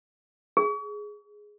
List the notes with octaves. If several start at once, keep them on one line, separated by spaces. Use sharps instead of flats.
G#4